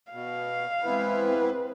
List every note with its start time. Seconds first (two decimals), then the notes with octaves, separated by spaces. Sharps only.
0.12 B2 F5
0.84 E3 G#3 B3 C4 E4 B4